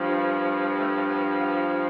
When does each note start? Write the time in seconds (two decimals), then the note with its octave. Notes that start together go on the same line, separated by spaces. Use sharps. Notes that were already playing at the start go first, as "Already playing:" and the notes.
Already playing: G2 F3
0.77 A3
1.08 B3
1.39 B3